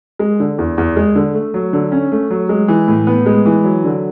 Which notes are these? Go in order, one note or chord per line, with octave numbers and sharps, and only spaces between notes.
G#3
D3
E2
E2
G#3
D3
A3
F#3
D3
C#4
A3
F#3
G#3
E3
A2
B3
G#3
E3
F#3
D3